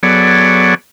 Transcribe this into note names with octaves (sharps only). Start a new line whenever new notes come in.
F#3 B3 G#4 A4 C#5 D5